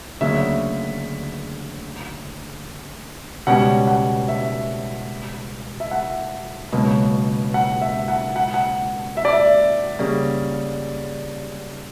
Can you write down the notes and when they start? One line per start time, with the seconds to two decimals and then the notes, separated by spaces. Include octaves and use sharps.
0.21 D2 C#3 F#3 A#3 E5
3.47 C#2 B2 G3 C#4 G4 F#5
3.88 F#5
4.28 E5
5.80 E5
5.91 F#5
6.73 C#2 B2 F#3 A#3
7.54 F#5
7.81 E5
8.08 F#5
8.36 F#5
8.54 F#5
9.17 E5
9.25 D5
9.33 E5
9.99 C#3 G3 A#3